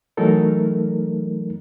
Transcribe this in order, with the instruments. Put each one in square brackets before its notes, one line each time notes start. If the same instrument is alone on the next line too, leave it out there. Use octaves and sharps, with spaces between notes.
[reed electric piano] E3 F#3 A3 D#4 A4 A#4